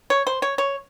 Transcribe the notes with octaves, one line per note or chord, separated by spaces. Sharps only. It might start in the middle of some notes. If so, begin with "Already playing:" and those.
C#5
C5
C#5
C#5